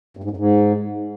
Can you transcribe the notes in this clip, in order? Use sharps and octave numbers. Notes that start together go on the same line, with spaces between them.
G2
G#2
F#2
G#2